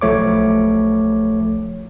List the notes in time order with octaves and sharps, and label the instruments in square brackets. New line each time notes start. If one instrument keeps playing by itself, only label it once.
[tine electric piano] B1 F3 A3 C#5 D6